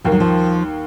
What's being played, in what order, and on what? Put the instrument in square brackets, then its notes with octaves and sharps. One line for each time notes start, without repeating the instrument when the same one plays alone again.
[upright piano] D#2 D#3 A#3 [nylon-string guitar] F3
[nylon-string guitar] F#3
F3